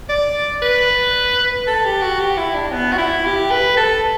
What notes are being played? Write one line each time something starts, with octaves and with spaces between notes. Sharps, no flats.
D5
B4
A4
G4
F#4
G4
E4
D4
B3
F#4
E4
G4
B4
A4